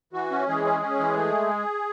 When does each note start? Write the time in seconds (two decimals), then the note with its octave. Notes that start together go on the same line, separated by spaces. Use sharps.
0.13 E3 F#4
0.31 C#4
0.47 E3 G#3 G#4
0.65 C#4
0.82 C#4
0.99 E3
1.16 A3